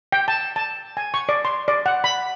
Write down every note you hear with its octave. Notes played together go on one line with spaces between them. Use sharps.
G5
A5
A5
G#5
C#6
D5
C6
D5
F#5
B5